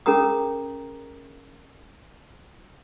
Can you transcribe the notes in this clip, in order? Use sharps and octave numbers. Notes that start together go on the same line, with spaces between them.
C#4 G#4 A#4 A#5 D#6